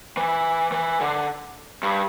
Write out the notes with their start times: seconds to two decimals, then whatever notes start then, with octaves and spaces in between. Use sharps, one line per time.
0.17 E3
0.72 E3
1.01 D3
1.83 G2